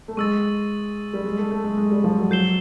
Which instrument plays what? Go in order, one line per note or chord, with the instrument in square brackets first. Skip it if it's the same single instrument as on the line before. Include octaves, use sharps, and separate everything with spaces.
[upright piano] A3
[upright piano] G#3 [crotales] C#6 E6 A6
[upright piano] G3
G#3
A3
A3
G#3
G#3
G3
F3
F#3
[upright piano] F#3 [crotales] G6 C7 E7 G7